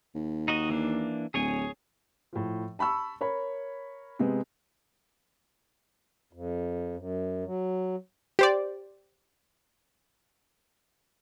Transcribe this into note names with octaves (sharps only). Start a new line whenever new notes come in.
D#2
D#4 F#4 D#5
E3 A#3 D4
D1 G#4 C#5 G#5
A2 F3
A5 B5 C#6 E6
A#4 C#5 B5
C3 G#3 B3
F2
F#2
F#3
G4 C5 D5